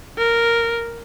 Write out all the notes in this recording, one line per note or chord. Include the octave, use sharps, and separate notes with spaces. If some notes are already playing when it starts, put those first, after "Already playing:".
A#4